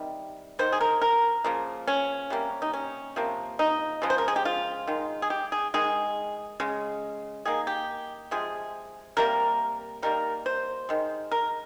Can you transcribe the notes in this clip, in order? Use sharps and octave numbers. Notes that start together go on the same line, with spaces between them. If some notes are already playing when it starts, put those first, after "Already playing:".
Already playing: C3 D#3 G3
D#3 A#3 C5
G#4
A#4
A#4
C#3 F3 A#3
C#4
C3 G3 A#3
D#4
C#4
C3 F3 A#3
D#4
C#3 F3 G#3
C5
A#4
G#4
G4
F4
D#3 G#3
G#4
G4
G#4
D#3 G#3 G#4
C#3 G#3
D#3 A#3 G#4
G4
C3 F3 G#3 G#4
C3 G3 A#3 A#4
D#3 G3 A#3 A#4
C5
D#3 G#3
A#4